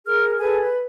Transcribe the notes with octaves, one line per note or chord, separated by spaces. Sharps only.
G#4 A#4 F6
G#4 A4 B4 G#5
B4